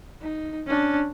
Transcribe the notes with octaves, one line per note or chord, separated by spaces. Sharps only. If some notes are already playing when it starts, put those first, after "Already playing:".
D#4
C#4 D4